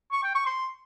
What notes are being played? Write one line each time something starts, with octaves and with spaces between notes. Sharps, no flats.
C#6
G5
C#6
C6